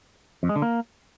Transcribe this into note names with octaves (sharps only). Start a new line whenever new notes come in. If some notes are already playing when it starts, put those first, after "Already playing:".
F2
G#3
D3
A#3